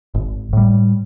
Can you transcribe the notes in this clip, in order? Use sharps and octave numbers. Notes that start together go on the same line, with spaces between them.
G#1
A2 G3